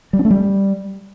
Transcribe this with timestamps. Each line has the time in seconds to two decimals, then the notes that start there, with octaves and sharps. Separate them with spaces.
0.13 G3
0.19 C#4
0.25 A3
0.31 G3